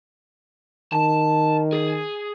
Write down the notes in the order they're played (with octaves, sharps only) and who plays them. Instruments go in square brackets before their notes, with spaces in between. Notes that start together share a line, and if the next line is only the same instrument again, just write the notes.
[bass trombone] D#3 [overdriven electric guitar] A5
[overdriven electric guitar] G#4